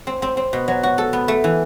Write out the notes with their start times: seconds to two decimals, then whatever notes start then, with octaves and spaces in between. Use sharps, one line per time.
0.07 C4
0.22 C4
0.37 C4
0.53 B2
0.68 F#3
0.83 F#4
0.98 A4
1.13 B3
1.28 A3
1.44 E3